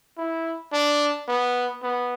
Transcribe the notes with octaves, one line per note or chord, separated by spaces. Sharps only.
E4
D4
B3
B3